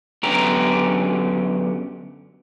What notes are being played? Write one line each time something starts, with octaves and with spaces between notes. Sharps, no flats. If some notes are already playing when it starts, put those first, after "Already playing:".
F#2 D3 B3 C#4 G4 A#5